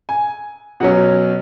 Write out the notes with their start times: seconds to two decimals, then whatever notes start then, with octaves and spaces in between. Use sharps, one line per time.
0.09 G#5
0.80 B2 F#3 C#4 F#5